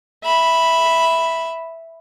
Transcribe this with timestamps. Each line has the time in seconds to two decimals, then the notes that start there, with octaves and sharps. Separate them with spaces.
0.24 E5 B5